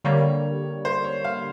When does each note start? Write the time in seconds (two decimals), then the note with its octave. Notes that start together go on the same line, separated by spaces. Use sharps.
0.04 D3 G3 A#3 C#5
0.85 C5
1.04 C#5
1.24 F5